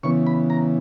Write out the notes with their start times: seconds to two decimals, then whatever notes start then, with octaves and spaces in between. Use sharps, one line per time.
0.03 C#3 E3 B3 C#6
0.27 B5
0.50 A#5